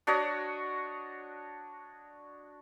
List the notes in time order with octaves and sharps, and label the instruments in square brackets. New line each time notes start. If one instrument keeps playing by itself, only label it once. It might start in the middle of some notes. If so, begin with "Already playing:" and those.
[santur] D4 F#4 C#5 D#5